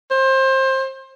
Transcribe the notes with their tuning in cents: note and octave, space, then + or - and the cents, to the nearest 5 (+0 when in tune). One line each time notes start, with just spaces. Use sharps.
C5 +25